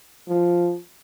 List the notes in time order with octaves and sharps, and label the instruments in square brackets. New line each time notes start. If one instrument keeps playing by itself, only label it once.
[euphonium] F3